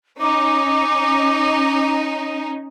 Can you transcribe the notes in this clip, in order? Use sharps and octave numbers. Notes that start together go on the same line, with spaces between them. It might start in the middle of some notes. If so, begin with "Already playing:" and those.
C#4 D#4 D6